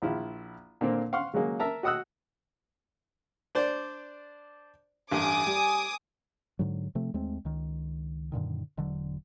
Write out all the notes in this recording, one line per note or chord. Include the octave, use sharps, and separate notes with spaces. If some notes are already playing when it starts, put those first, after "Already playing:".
A#1 E4 F4
A#2 D3 A#3 C4
F5 F#5 C6 C#6
C#3 F#3 G#3 A#3
A#4 E5 A5 A#5
F#4 D#5 F#5 D#6 E6 F#6
D4 C5 D5
A1 G2 G#5 D6 D#6
G3
G#2 D3 F#3
C3 F3 A3 C4
D#2 G#3 A3 C4
C#2 D#3
F#2 A#2 D3 D#3
E1 D3 F#3